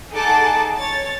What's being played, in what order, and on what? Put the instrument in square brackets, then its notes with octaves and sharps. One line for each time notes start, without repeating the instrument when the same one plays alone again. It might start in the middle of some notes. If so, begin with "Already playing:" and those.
[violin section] D#4 G#4 A4 F#5 A5 D6
C#5 A6